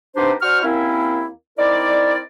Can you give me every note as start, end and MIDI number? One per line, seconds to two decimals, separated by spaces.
0.16 0.33 48
0.16 0.33 59
0.16 0.33 62
0.16 0.33 63
0.16 0.33 67
0.16 0.33 72
0.42 0.61 62
0.42 0.61 66
0.42 0.61 72
0.42 0.61 85
0.42 0.61 89
0.64 1.28 39
0.64 1.28 58
0.64 1.28 60
0.64 1.28 61
0.64 1.28 64
1.59 2.19 60
1.59 2.19 63
1.59 2.19 64
1.59 2.19 70
1.59 2.19 74